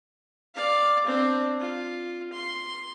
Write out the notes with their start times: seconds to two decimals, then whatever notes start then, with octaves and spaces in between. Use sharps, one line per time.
0.54 D5 F5
1.06 C4 D4
1.60 F4
2.33 C6